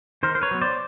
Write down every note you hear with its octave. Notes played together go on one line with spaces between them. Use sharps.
D#3 A#4 C5
C5
B4 C#5
F#3 B3
C5 D5